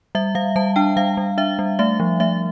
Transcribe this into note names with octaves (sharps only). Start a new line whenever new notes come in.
G3 E5
G3 F5
G3 A5
D4 G5
G3 F5
G3
D4 E5
G3
A3 E5
F3
A3 E5